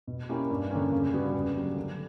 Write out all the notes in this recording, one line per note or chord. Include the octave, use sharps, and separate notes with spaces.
B2
A#3 C#4 E4 G4
G2
D3 A#3 C#4
C#3
G3 B3 F#4
C#3
F#3 A#3 D4 G4
D3